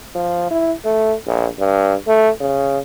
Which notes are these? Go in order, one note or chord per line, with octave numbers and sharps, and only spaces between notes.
F3
E4
A3
A#1
G2
A3
C#3